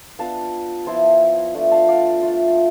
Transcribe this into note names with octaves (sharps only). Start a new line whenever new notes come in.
B3 D4 F4 F5 A5
F3 B3 E4 A5 C6
A3 D4 F4
F5 A5
D5 F5
A3 D4 F4